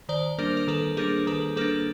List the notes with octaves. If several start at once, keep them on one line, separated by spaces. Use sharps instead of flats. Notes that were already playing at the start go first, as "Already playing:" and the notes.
D#3 C5 D5
G3 A#3 D4 A#4 C5
A#4
D#3 A4 B4
G3 A#3 D4 G#4 A#4
D#3 A4 B4
G3 A#3 D4 A4 B4